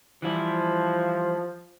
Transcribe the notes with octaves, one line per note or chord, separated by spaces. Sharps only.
E3 F3 G3 E4